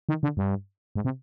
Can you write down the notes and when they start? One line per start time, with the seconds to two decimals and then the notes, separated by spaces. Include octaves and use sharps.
0.09 D#3
0.23 D3
0.37 G2
0.95 G#2
1.05 C3